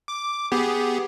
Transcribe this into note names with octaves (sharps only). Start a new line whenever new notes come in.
D6
B3 G4 G#4